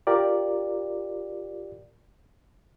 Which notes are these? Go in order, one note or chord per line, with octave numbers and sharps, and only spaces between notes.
F4 G4 A#4 D5